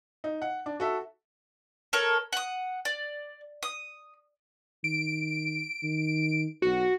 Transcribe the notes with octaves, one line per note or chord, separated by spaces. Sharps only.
D#4
F#5
D4
F#4 A4 E5
A4 A#4 C#5
F#5 D#6
D5
D#6
D#3 D7
D#3
B1 F#4